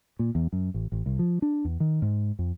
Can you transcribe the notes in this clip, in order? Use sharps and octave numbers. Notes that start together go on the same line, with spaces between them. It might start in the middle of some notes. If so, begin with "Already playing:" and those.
A#2
E2
F#2
A1
A1
C2
F3
D4
E2
D#3
G#2
F2